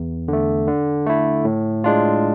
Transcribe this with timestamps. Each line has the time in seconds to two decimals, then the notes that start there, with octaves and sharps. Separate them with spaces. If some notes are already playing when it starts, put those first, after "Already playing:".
Already playing: E2
0.28 D3 A3
0.68 D3
1.06 A3 E4
1.45 A2
1.84 G#3 D4 F4